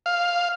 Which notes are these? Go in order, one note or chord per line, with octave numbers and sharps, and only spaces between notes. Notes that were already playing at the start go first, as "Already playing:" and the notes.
F5